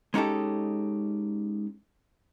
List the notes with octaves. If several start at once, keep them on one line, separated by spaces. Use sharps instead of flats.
G#3 C#4 D#4 G4 A4